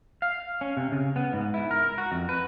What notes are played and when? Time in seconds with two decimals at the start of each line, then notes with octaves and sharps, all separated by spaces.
0.22 F5
0.61 C#4
0.77 C3
0.92 C#3
1.16 B3
1.33 G#2
1.54 E4
1.71 A#4
1.98 F#4
2.12 F2
2.29 B4